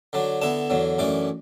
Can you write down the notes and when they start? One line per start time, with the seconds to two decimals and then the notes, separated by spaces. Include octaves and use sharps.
0.13 D3 F#3 D4
0.42 D3 B3 E4 A5
0.70 E2 D3 F#3
0.99 F#2 E3 A3 D4 D6